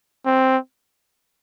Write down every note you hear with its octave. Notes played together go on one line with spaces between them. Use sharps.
C4